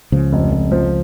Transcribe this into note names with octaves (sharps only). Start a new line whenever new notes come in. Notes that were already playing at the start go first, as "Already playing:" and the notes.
C#2 C#3 F3
F1
F1
F3